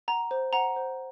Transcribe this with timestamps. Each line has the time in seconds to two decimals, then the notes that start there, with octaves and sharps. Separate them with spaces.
0.08 F#5 A#5
0.31 C5
0.53 F#5 A#5
0.76 C5